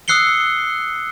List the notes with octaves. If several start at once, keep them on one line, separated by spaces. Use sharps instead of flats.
D#6 E6 F#6 C7 C#7 G7